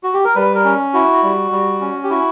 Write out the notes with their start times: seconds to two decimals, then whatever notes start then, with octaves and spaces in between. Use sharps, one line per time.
0.03 F#4
0.14 G4
0.25 A#4
0.35 G3 B4
0.55 A#4
0.64 C#4
0.94 E4 F#4
1.23 G3
1.52 G3
1.81 C#4
2.03 G4
2.10 E4 F#4